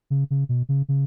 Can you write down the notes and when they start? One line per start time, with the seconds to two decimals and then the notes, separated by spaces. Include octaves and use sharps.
0.10 C#3
0.31 C#3
0.49 B2
0.69 C#3
0.89 C#3